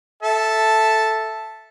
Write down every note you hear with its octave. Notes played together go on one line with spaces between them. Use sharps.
A4 E5 A5